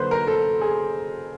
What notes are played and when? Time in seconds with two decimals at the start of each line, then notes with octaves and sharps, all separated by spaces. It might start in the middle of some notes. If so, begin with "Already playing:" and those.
Already playing: D3 F#3 A#3 B4 C5
0.11 A#4
0.27 A4
0.61 G#4